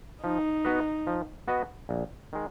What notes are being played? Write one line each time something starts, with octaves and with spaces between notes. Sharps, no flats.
F3 D#4
B3 F#4 B4 D#5
F3
B3 F#4 B4 D#5
A#1
D#3 G#3